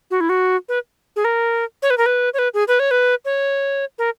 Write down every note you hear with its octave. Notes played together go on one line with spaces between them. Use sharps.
F#4
E4
F#4
B4
G#4
A#4
C#5
B4
A#4
B4
C#5
B4
G#4
B4
C#5
B4
C#5
A#4